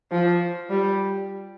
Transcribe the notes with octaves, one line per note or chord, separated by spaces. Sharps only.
F3
G3